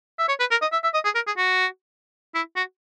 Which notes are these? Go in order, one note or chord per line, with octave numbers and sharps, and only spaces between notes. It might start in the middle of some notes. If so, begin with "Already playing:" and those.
E5
C#5
B4
A#4
D#5
E5
E5
D#5
G#4
A#4
G#4
F#4
E4
F#4